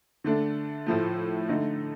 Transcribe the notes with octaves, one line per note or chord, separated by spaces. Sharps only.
D3 A3 D4
A2 F3 A3
D3 A3 D#4